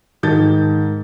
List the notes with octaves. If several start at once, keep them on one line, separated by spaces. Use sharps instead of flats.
G#2 D#3 A5 G6 A6